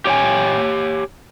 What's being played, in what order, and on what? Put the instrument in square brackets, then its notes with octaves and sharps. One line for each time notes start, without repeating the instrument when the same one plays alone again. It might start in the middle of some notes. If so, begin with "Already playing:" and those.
[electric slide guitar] G4 C#5 G5 G#5